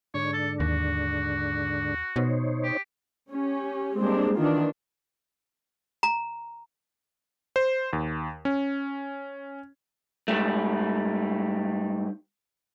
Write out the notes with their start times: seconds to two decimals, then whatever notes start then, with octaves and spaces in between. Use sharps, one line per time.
0.14 G#2 D3 D4 C#5
0.33 A4
0.60 D#2 F#4
2.16 B2 D#4 C5 C#5
2.64 G4
3.31 C#4 G4
3.97 G3 G#3 A#3 C4 D4
4.35 D#3 E3 D4 F4
6.03 A#5
7.56 C5
7.93 D#2
8.45 C#4
10.28 G#2 G3 A3